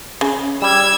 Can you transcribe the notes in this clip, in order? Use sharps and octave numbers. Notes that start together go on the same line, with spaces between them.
C#3
G3 E6 G#6